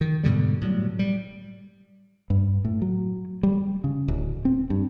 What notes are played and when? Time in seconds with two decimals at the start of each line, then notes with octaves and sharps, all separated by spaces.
0.01 D#3
0.23 G#2 B2 D3 G3
0.61 A2 F#3 G3
0.99 G3
2.30 G2
2.65 A2
2.82 F#3
3.43 G3
3.84 C#3
4.08 D1
4.45 C4
4.70 G2